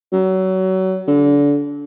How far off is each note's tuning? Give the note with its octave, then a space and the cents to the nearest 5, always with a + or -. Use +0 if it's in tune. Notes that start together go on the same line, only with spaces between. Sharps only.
F#3 +25
D3 -30